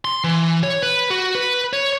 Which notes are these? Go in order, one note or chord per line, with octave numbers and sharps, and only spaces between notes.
C6
E3
C#5
B4
F#4
B4
C#5